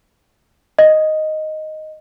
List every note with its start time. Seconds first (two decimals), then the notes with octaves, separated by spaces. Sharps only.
0.79 D#5